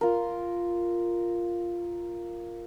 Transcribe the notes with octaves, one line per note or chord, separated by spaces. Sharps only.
F4 A#4